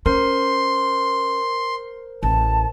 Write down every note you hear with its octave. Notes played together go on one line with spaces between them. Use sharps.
C#4 A#4 C5 C6
A1 A5